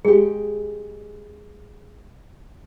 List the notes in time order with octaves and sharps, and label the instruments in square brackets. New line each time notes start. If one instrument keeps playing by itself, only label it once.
[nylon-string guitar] G#3 G4 [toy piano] G#4